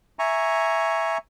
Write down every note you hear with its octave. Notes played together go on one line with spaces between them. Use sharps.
E5 G#5 A#5 C#6